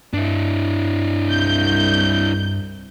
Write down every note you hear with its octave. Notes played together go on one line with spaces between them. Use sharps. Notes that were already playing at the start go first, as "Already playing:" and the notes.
G2 D4 E4
C2 G6